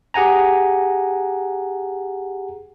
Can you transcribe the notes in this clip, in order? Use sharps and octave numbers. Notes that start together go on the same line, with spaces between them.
G4 G#4 F#5 G#5 A#5